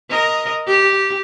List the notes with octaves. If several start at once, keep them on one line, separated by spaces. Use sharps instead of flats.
A#4 D#5
G4